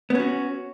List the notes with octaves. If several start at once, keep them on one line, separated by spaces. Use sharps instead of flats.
B3 C#4 F#4